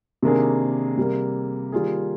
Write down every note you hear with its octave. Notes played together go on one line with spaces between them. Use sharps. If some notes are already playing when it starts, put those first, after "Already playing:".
C3 D#3 A#3 D4 G#4
C3 G3 A#3
D#3 G3 A#3 F4 G#4